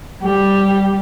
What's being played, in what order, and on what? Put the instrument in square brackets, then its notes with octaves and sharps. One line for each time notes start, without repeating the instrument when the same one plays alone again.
[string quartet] G3 G4